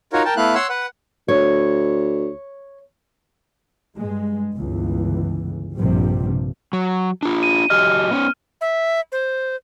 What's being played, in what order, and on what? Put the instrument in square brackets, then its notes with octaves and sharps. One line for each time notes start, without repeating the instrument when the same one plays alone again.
[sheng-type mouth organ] D#4 F4 F#4 A#4 C#5
A#4 G5 A5
A3 B3 E4 F5 F#6
C#5 F#5 C6 E6
B4 F#5
[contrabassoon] D2 [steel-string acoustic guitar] C#5
[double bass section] G2 G#3
G1 C#2 E3
A#1 G2 C3 F3 G3
[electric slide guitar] F#3
D4 F4
[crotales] D#7
[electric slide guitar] F#3 G4 D#5 [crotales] F6
[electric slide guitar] B3 C#4
[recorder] E5
C5